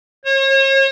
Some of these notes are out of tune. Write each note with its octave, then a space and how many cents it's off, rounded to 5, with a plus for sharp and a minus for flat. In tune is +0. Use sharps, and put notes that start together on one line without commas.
C#5 -40